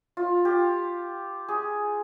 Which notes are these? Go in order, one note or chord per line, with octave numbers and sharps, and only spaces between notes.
F4
G4
G#4